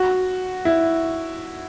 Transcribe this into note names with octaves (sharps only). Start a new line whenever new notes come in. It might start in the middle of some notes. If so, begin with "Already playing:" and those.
Already playing: F#4
E4